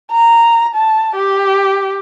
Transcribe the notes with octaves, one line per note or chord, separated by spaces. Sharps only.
A#5
A5
G4